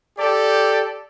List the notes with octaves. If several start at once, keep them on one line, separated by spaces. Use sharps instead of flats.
G4 A4 D5